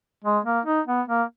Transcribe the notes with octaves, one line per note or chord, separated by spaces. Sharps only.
G#3
A#3
D#4
B3
A#3